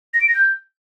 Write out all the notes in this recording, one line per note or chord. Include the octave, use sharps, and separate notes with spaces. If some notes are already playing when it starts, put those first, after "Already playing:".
A#6
D7
A#6
G6